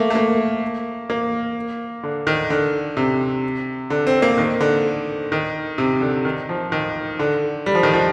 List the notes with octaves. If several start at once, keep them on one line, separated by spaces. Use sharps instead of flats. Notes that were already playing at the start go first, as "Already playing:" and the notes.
Already playing: A3 A#3
A3
A#3
A#3
D3
D#3
D3
C3
D3
C4
A#3
D#3
D3
D#3
C3
D3
D#3
F3
D#3
D3
G3
F3
D#3
F3